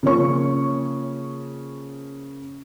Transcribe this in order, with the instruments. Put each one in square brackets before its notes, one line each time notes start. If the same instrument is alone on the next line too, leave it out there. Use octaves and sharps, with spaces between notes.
[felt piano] C#3 F3 A#3 C#5 C#6